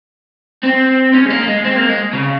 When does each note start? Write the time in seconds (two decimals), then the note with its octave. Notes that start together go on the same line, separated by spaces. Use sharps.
0.64 C4
1.14 C#4
1.26 G#3
1.30 A#3
1.47 G#3
1.65 C4
1.76 A#3
1.89 G#3
2.14 C#3